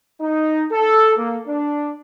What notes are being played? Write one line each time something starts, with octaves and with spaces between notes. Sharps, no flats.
D#4
A4
A#3
D4